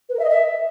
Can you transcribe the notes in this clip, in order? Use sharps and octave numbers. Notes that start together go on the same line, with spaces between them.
B4
A#4
E5
D#5
E5